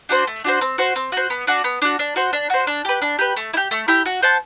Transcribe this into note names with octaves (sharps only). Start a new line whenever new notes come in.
D4 F#4 C5
A3
D4 F#4 C5
C4
F#4 C5
C4
F#4 C5
B3
D4 F#4
B3
D4 F#4
D4
F#4 C5
D4
F#4 C5
D4
G4 B4
D4
G4 B4
A3
E4
G4
A3
E4 G4
F#4
C5 F#5 A5